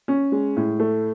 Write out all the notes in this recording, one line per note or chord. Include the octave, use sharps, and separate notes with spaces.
C#4
G#3
A2
A3